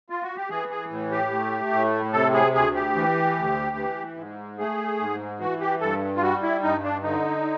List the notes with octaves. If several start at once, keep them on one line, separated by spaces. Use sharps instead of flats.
F4
F#4
G4
E3 G#4
G#4
A2
G4
A3
A2
C3 A4
G#4
D2 G#4
G4
E3
D2
E3
G#2
A3 G#4
G#2
E3 F#4
G4
G2 A4
F4
G3 F#4
E4
G2 D#4
D4
D3 D#4